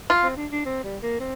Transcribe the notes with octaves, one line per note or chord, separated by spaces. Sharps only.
F4
C4
D4
D4
C4
G3
A#3
C4